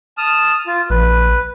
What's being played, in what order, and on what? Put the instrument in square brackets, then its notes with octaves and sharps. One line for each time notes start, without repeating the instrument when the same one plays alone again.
[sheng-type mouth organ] A5 D#6 F6
F4
[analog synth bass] A#1 [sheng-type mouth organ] B4